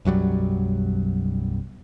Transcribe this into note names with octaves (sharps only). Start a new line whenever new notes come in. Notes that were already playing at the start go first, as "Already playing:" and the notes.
B1 F#2 F#3 G3